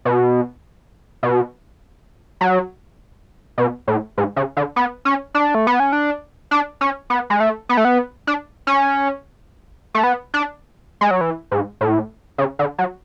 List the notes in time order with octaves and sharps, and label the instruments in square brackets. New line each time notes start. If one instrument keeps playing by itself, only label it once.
[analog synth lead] B2
B2
F#3
B2
A2
G#2
C#3
D3
B3
C#4
D4
A3
B3
C#4
D4
D4
C#4
B3
G#3
A3
B3
A3
B3
D4
C#4
A3
B3
D4
G#3
F#3
E3
G#2
A2
C#3
D3
F#3